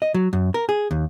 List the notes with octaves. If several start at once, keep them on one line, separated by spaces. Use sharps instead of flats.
D#5
F#3
F#2
A#4
G#4
D#2